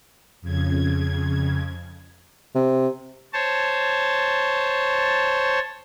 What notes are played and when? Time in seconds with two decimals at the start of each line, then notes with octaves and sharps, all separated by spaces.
0.41 F2 C#3 G#6
2.55 C3
3.33 C5 C#5 A5